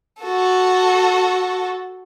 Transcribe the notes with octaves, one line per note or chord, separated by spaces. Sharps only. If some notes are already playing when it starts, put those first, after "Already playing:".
F#4 A4